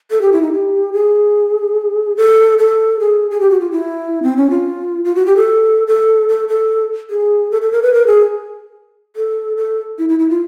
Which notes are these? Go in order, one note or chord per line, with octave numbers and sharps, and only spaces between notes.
A4
G4
E4
D#4
G4
G#4
A4
A4
G#4
G#4
G4
F#4
F4
E4
C4
C#4
F4
F4
F#4
G4
A4
A4
A4
A4
G#4
A4
A4
A#4
B4
A#4
G#4
A4
A4
E4
E4
E4
F4